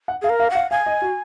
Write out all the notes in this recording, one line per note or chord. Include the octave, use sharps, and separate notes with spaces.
F#5
G#4 F5
A#4
F5
F#5
F5
F5 G#5
D#5
F#4